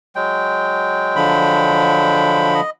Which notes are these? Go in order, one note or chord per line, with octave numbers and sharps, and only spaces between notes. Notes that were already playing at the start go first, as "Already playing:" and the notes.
F#3 G#3 G5
D3 F3 B5
D#5